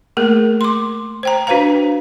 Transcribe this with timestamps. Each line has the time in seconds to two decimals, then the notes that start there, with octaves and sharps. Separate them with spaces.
0.17 A3 A#3 G#4 A#4
0.61 C6 D6
1.23 C5 G5 A#5
1.47 D4 F#4 B4 C5 F5 A#5